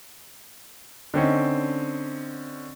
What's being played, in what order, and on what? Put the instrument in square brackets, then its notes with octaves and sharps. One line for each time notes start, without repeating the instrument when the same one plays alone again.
[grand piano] D3 C4 C#4 D#4